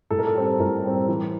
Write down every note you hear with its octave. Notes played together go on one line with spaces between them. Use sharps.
A2 A4
A#4
A4
G3 C4
A2 A#4
G3 C4
E3